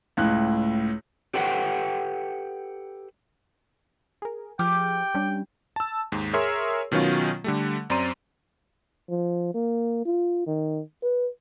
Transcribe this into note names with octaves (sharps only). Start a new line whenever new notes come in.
C#2 A2 F#6
G4 A4 B4 C#5 F#5 G5
G#4 A#4
F3 G4 G#4 G5 D6 F6
G3 C#4 D4
A5 E6
D#2 G#2
G#4 A#4 C#5 E5 C6 E6
B2 D#3 F#3 C#4 F4
D3 G3 A3
F#2 C4 D5 A#5 C6 D#7
F3
A#3
F4
D#3
B4